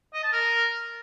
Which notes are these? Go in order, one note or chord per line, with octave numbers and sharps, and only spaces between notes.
D#5
A5
A#4